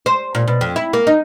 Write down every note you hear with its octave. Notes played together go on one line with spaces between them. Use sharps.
C5
A#2
B2
F2
E4
A#3
D#4